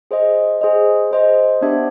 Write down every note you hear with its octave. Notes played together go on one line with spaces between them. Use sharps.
G#4 C5 D#5
G#4 C5 D#5
G#4 C5 D#5
B3 D4 G4 C5 E5